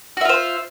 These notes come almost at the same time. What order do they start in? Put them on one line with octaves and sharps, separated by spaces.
F#4 E5 F4 C5